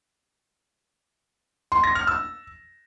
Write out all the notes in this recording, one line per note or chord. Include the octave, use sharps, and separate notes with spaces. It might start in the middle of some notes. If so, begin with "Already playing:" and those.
C6
A#6
F6
E6